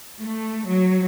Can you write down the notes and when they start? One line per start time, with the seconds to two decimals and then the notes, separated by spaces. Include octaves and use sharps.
0.21 A3
0.67 F#3